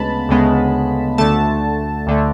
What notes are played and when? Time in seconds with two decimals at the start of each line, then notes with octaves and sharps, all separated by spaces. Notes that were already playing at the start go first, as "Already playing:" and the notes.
Already playing: D2 C#3 G#3 B3 A5 B5
0.29 D2 C#3 G#3 B3
1.18 D2 D3 A3 A5
2.07 D2 D3 A3